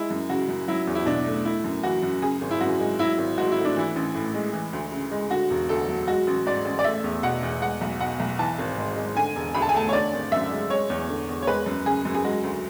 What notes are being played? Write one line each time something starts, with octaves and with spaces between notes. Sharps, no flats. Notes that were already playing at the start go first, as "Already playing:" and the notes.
Already playing: G#3 E4
F#2
C#3 F#4
F#2
F#3 E4
E2
E4
B2 D4
A3
A3 E4
F#2
E3 F#4
F#2
C#3 G#4
G#1
E4
F#2 F#4
G#3
F#3 E4
G#1
G#2 F#4
E4
A3
D4
E3 E4
A1
A2
G#3
E3
D2
C#3
G#3
D3 F#4
E1
D2 A4
F#3
G#3 F#4
A1
G#2 D5
A1
D5
A3 E5
E2
B2 F#5
E2
G#3 F#5
B1
B2 F#5
B1
E3 A5
G#1
G#2
G#3
D3 G#5
E1
D2 B5
A5
G#5
A3 A5
C#5
D3 D5
G#1
F#2 E5
G#3
G#3 C#5
E2
D3
E2
C#5
G#3 B4
F#2
C#3 G#4
F#2
G#4
G#3 F#4
D2